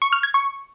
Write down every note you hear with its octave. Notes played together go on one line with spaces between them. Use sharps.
C#6
F6
G#6
C#6